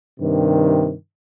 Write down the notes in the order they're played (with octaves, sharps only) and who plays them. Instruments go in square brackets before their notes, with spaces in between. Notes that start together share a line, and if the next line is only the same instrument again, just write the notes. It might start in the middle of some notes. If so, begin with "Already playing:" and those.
[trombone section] G2 C3 D#3